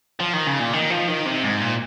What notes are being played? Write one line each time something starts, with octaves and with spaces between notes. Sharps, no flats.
F3
D#3
C#3
A#2
D#3
F3
D#3
C3
G#2
A#2